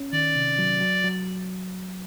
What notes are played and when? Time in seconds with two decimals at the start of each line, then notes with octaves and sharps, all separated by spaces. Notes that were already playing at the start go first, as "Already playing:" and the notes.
Already playing: C#4
0.12 D#3 D5
0.35 C3
0.59 F#3
0.80 F#3
1.04 F#3